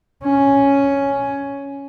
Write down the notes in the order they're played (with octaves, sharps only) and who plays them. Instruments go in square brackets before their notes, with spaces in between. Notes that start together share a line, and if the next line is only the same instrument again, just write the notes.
[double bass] C#4